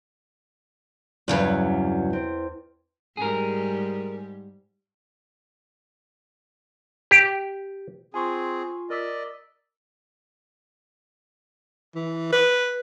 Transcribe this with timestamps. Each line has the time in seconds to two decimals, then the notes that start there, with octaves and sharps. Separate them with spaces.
1.28 E2 G2 C#3 F#3 E4 B4
2.13 C4
3.17 G#2 G3 G#4 A#4
7.11 G4
8.14 C4 F4 G#4 G#5 C6 C#6
8.90 A#4 D5 D#5 E6 B6
11.95 E3
12.32 B4